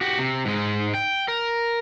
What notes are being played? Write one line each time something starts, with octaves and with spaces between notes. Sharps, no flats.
F#4 G4
C3
G#2 G#3
G5
A#4